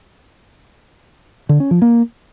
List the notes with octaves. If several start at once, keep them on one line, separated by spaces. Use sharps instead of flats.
D3
C#4
F3
A#3